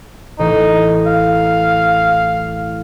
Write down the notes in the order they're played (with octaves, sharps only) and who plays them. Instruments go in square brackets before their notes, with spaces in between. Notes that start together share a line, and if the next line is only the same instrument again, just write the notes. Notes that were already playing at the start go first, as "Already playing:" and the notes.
[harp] A1 [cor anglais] D#4
[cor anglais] F5